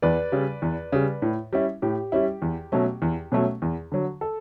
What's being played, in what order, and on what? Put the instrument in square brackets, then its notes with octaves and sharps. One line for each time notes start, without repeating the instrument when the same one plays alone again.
[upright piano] E2 B4 D5
C#3 G3
E2
C#3 G3
A2
G3 C#4 E4
A2 G4
G3 C#4 E4
E2
B2 F#3 A3 C#4
E2
B2 F#3 A3 C#4
E2
D3 F#3
A4